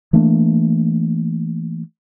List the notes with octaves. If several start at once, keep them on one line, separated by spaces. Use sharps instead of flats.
E3 A3 A#3 D4